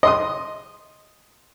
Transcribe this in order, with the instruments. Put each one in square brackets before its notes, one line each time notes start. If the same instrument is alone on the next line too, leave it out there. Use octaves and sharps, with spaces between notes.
[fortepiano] D#5 C6 D#6